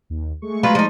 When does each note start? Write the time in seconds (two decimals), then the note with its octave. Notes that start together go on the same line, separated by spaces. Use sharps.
0.10 D#2
0.42 G#3 A3 C#6
0.63 F#3 F4 B4
0.75 F3 D#4